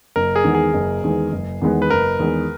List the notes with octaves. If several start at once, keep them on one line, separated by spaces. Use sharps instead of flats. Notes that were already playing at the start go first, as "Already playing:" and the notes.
F#1 A#4
G#4
E2 D#3 G#3
G#4
F#1
E2 D#3 G#3
F#1
E2 D#3 G#3 B3
B4
F#1 A#4
E2 D#3 G#3 B3